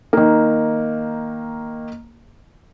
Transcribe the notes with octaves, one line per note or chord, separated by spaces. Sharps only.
D#3 A#3